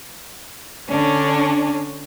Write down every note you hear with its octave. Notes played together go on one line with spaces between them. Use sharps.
D3 C#4 D4